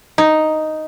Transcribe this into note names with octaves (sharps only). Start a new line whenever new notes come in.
D#4